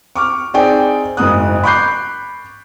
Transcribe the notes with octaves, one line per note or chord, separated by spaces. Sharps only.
C#6 D6 F6
C4 D#4 G#4 D5 G5
F#1 G#2 D#6 F#6
B5 C#6 D6 F#6 G6 C7